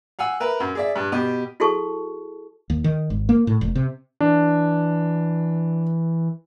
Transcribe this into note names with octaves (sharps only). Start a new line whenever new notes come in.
F5 F#5 G#5 E6
A#4 B4 E5
F#2
G#4 D5 E5
G2
B2 G4
E4 F#4 G#4 A4 A5 C#6
D#2
D#3
G#1
A#3
A2
F1
C3
E3 D4